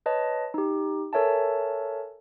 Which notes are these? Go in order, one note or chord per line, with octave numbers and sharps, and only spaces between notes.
B4 C#5 D#5 A5
D#4 G4
A4 A#4 C#5 E5 G#5 A5